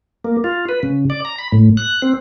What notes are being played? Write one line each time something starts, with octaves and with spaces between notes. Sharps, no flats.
A#3
F4
B4
C#3
D5
A#5
B5
A2
F#6
C4